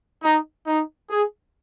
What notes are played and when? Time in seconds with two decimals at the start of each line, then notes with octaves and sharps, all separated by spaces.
0.24 D#4
0.67 D#4
1.10 G#4